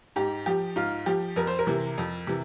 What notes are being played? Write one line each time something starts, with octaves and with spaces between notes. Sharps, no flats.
G#2 G4
F3 G4
G#2 F4
F3 G4
F2 A#4
C5
A#4
C3 E3
F2
C3 E3